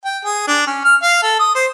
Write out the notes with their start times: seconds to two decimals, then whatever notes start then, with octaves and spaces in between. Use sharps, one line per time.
0.05 G5
0.25 G#4
0.48 D4
0.67 C#4
0.85 F6
1.03 F5
1.23 A4
1.40 D#6
1.55 C5